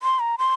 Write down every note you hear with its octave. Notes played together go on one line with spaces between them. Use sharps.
C6
A#5
C6